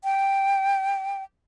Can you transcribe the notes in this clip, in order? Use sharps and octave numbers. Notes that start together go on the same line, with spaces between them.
G5